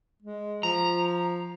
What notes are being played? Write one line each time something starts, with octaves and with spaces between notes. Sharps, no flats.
G#3
F3 A#5